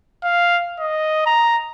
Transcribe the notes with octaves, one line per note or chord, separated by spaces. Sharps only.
F5
D#5
A#5